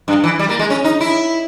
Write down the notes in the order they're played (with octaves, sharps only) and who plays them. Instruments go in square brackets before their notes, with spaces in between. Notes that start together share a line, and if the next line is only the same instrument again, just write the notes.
[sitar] G2
E3
G3
A#3
G#3
C#4
D#4
E4